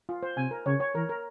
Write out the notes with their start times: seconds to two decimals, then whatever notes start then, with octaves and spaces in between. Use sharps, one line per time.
0.09 F4
0.23 C5
0.37 C3 G#5
0.51 A#4
0.66 C#3 C#5
0.80 C#5
0.95 E3 A#4
1.09 A#4